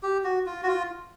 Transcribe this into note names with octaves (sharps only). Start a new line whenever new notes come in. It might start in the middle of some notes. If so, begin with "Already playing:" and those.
G4
F#4
F4
F#4
F4